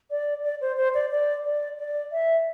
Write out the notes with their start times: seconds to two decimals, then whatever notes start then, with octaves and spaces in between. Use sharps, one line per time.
0.11 D5
0.43 D5
0.61 C5
0.77 C5
0.94 D5
1.11 D5
1.45 D5
1.78 D5
2.12 E5